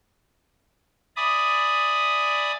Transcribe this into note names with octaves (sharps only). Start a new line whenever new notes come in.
D5 E5 G#5 B5 D6 D#6